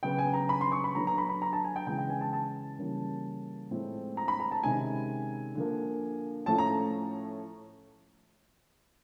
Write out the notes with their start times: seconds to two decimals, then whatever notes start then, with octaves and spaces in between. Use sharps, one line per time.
0.03 C#3 F#3 B3 G5
0.18 G#5
0.34 A#5
0.49 B5
0.61 C6
0.72 C#6
0.84 B5
0.95 D3 F#3 B3 A#5
1.07 A#5
1.18 B5
1.29 B5
1.42 A#5
1.53 A5
1.65 G#5
1.76 G5
1.87 C#3 E3 G#3 B3 G5
1.98 G5
2.10 G#5
2.21 A5
2.33 A5
2.79 C#3 E3 G3 A#3 C#4
3.71 A2 F3 G#3 C4
4.17 A#5
4.28 B5
4.40 A#5
4.51 A5
4.63 C3 D#3 G#3 C#4 G#5
5.55 D3 F3 A#3
6.46 A2 F3 A3 C#4 A5
6.58 A#5